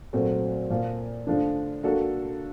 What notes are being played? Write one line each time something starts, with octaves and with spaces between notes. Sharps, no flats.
A#2 F#3 A3 C4
A#2 F3 A#3
D3 F3 A3 D4
A#3 D4 F#4 A4